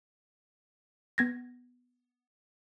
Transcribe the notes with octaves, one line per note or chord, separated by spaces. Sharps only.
B3 G#6 A#6